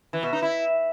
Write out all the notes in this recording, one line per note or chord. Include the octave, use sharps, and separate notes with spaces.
E3
B2
D#4
E4